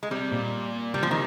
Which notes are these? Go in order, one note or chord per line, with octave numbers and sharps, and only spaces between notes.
G#3
C3 G3
A#2
C3 G3
F3
D#3